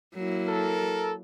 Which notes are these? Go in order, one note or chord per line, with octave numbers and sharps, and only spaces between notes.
F#3 A#3 E4
A4 A#4